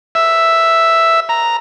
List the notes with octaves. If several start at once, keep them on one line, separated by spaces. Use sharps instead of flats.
E5
A#5